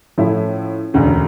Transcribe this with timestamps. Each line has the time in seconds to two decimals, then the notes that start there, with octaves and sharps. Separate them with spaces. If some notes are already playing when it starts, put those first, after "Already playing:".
0.18 A2 F3 A3 C#4 E4
0.94 E1 D2 C#3